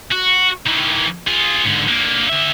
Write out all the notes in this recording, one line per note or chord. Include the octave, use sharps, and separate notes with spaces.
F#4
D#3 E3
F4 G#4
G#2 D3
D3 A#3
D3 E5